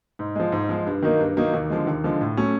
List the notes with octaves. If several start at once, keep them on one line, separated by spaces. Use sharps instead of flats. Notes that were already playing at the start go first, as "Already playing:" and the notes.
G#2
F3 G#3
G#2
F3 G#3
G2
D#3 F#3 A#3 D#4
G2
D#3 F#3 A#3 D#4
D#2
D3 F3 G#3
D#2
D3 F3 G#3
A2
F#3 A3 C#4